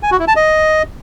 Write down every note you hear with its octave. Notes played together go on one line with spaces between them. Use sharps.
G#5
F#4
E4
A5
D#5